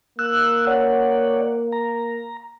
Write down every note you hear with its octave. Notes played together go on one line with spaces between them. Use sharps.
A#3 E6 F#6
C#5 D5 F#5
A#5